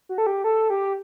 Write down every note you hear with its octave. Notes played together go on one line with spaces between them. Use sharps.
F#4
A4
G4
A4
G4